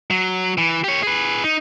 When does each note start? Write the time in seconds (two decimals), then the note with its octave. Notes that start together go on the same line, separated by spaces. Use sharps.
0.11 F#3
0.58 E3
0.84 G4 C#5
1.03 G#4 B4
1.44 D#4